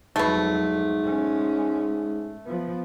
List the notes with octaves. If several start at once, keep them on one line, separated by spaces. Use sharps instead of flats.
F2 G#2 B2 F#3 A3
G#3 C#4
F3 B3